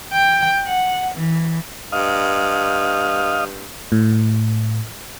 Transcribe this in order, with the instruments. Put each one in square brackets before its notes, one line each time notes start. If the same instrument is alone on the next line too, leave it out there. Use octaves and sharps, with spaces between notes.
[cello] G5
F#5
E3
[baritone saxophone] G2 [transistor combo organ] D#5 F5
[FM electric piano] A2